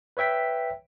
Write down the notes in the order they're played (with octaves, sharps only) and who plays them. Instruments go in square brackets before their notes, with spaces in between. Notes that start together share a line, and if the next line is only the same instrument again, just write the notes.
[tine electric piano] B4 C#5 E5 G5 B6